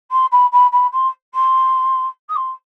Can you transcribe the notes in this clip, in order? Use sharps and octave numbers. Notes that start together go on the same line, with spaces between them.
C6
B5
B5
B5
C6
C6
D#6
C6